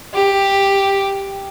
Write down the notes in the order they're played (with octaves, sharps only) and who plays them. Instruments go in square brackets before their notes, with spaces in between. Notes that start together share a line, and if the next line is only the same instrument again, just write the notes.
[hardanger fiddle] G4